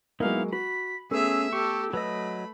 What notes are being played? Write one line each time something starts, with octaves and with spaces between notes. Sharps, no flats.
F#3 G#3 A#3 B3 D#4 E4 F5
F#4 B5 B6
A3 B3 C#4 G#4 E5 E6
G4 A4 C#6
F#3 A3 B4 D#5 B5